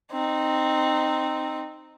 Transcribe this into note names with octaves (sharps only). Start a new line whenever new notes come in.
C4 D#4